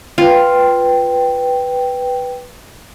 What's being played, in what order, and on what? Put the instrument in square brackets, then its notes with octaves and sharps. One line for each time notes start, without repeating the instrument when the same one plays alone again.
[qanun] F4 [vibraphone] B4 G5